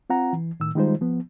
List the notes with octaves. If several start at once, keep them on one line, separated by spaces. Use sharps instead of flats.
C4 F4 F#5 A#5
E3
A2 D#3 E6
D#3 G3 G#3 D#4 F4 C5
F3 B3